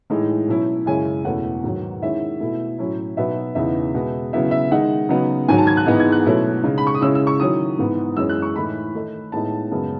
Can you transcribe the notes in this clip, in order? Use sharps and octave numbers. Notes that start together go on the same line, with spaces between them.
A2 E3 G#3 D#4
B2 F#3 C#4 E4
F#2 C#3 G#3 C#4 E4 G#5
E2 B2 A3 C#4 E4 F#5
G#2 D#3 F#3
D#3 G#3 C#4 E4 E5
B2 A3 E4
A2 F#3 C#4 E4
B2 F#3 B3 D#4 E5
E2 C#3 E3 B3 D#4 E5
B2 G#3 B3
C#3 F#3 B3 E4 E5
E5
D#3 G#3 D#4 F#5
C#3 F#3 B3 D#4
G#2 D#3 F#3 G#5
A5
G#6
F#6
G#2 E3 G#3 B3 D#4
G#6
F#6
B2 F#3 A3 C#4 E4
C#3 G#3 D#4
B5
C#6
D#6
C#3 G#3 C#4 E4 E6
E6
C#6
D#3 F#3 C#4 E4 D#6
G#2 E3 B3
F#2 E3 G#3 C#4 E6
F#6
C#6
A2 E3 A3 D#4 B5
D#3 A3 D#4
A2 G#3 B3 D#4 A5
F#2 C#3 G#3 B3